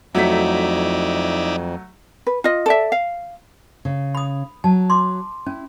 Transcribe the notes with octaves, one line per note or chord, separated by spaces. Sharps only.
F2 F#3 A3 D#4 E4 D5 B6
B4
F4 D#5
A4 D5 E5
F5
C#3
B5 D#6
F#3 A5
C6 D6
C#4 E4